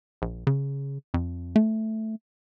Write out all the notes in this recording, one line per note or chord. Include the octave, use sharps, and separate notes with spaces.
A#1
C#3
F2
A3